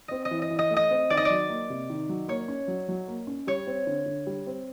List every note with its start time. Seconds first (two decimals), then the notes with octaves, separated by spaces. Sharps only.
0.08 C4 D#5
0.25 D#5
0.31 E3
0.42 D#5
0.50 E3
0.59 D#5
0.71 A3
0.76 D#5
0.90 C4
1.10 D#3 D5
1.17 D#5
1.25 F#3 D5
1.49 A#3
1.70 C3
1.90 D#3
2.09 F#3
2.28 A#3 C#5
2.48 C#4
2.68 F#3
2.89 F#3
3.08 A#3
3.27 C#4
3.47 G3 C#5
3.67 C4
3.87 D3
4.06 D3
4.27 G3
4.47 C4